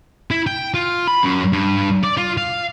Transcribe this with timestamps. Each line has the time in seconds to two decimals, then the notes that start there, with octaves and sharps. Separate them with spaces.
0.31 E4
0.47 G5
0.74 F4
1.08 B5
1.23 F#2
1.53 G2
2.03 D5
2.17 F4
2.37 F5